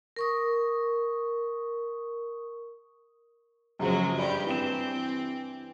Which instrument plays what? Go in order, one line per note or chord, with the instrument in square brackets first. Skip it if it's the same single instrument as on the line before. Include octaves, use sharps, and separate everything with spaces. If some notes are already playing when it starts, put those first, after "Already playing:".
[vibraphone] A#4 C#6 D#6
[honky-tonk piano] F#2 C#3 F3 [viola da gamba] F#3 G#3
[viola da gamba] G2 G4 [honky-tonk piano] D4 B5
[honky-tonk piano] E3 E7 [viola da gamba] C4